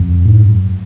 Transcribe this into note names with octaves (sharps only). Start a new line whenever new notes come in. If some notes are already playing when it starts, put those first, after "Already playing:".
Already playing: F2
A2
G#2
F#2